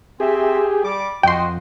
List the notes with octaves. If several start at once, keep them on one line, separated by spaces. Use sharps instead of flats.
C4 G4 G#4 E5
G3 D6
F2 F#4 D#5 G5 C6